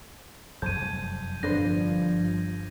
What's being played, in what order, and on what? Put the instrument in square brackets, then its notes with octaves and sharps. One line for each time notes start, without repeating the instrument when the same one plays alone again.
[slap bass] F1 F#2 G3 [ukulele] C5 A5 [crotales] G6 G#6 D#7
[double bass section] G1 F3 [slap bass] D3 [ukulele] D4 B4 C5 [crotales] A#6